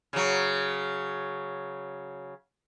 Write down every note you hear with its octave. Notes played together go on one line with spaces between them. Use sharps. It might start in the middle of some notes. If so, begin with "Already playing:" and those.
C#3 F#3